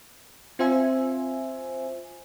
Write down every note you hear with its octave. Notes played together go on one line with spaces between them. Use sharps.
C4 F4 C5 E5 G#5